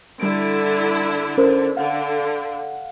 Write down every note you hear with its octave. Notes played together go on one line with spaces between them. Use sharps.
D3 G3 E4 D7
C#4 A#4 C5
D3 F5 F#5